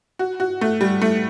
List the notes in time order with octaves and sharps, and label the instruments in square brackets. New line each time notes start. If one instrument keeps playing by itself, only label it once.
[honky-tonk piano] F#4
F#4
A3
G3
A3